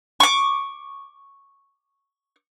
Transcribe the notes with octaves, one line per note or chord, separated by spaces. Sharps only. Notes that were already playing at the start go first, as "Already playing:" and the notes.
C#6 D6